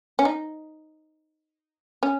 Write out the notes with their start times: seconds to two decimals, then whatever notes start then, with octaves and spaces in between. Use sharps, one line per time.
0.19 C#4
0.25 D#4
2.03 C#4